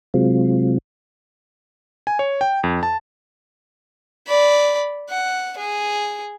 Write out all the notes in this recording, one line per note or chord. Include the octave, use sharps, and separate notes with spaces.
C3 F#3 G#3 C4 F4
G#5
C#5
G5
F2
A5
D5 B5
F#5
G#4